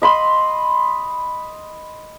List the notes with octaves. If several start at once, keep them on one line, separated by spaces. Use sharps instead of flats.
D#5 B5 C6